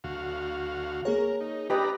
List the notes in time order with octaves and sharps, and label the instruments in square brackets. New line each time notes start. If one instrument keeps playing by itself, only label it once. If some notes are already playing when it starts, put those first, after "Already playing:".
[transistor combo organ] D2 F#4 F5
[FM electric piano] A#3 G#4 C#5 [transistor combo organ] A#4
[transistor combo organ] D#4
[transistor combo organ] D4 A#5 B5 [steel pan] G4 B4 D#5